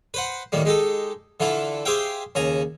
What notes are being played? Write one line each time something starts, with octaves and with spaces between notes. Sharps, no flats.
B4 C5 F#5
D#2 A2 D#3 G3 A#3
G#3 D#4 G4 A4
D3 E3 E4 F4 A4
G4 G#4 C5 E5 F5 G5
D#2 C#3 G#5 A#5